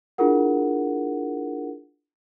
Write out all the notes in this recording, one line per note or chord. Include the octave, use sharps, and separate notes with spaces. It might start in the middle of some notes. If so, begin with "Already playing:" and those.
D4 E4 F4 G#4 A#4 F#5